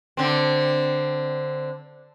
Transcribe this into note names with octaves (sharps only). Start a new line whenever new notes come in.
D3 C4